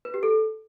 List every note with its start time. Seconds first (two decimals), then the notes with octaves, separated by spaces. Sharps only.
0.05 B4
0.14 G4
0.23 A4